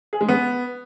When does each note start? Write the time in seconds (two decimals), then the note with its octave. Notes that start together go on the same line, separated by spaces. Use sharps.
0.13 G#4
0.21 G#3
0.28 B3